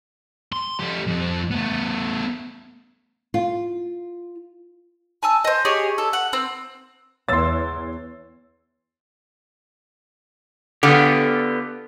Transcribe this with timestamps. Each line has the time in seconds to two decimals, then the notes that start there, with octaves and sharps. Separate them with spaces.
0.52 C6
0.80 A3 G4
1.08 F2 C4
1.51 A3 B3
3.34 F4
5.23 G#5 A5 E6
5.45 C5 D#5
5.65 G4 G#4 C#5 D#5
5.98 A4
6.13 F#5
6.33 C4
7.29 E2 C#5 C6 E6 A6
10.83 D3 B3 F4 G4